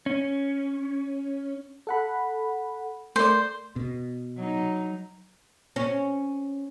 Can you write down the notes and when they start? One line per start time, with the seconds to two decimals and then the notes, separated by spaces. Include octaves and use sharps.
0.06 C#4
1.87 A4 F#5 B5
3.16 A3 A#4 C5 D5
3.76 B2
4.36 F#3 D#4
5.76 C#4